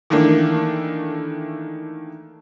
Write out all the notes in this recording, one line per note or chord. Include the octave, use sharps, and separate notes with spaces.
D#3 E3 A3 A#3 D4